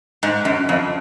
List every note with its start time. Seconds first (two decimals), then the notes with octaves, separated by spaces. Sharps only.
0.23 G#2
0.45 F#2
0.69 F2